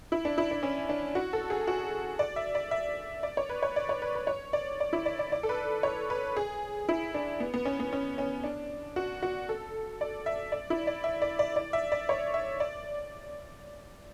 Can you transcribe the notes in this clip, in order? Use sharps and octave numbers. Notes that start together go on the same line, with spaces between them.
E4
D4
E4
D4
C#4
D4
F#4
A4
G#4
F#4
D5
E5
D5
E5
D5
C#5
B4
C#5
D5
C#5
B4
B4
C#5
D5
D5
E4
D5
D5
D5
A4
B4
C#5
B4
G#4
E4
D4
B3
B3
C#4
B3
C#4
C#4
D4
F#4
F#4
A4
D5
E5
D5
E4
D5
E5
D5
D5
D5
E5
D5
C#5
E5
D5